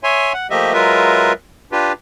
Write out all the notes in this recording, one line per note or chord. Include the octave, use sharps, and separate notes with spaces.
C#5 E5 G#5 C6
F#5
F3 A3 A#3 G4 D#5 E5
F#3 G#3 F4 A#4 B4 E5
D4 F4 G4 B4